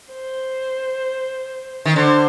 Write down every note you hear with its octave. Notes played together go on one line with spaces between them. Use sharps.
C5
D#3
D3 C5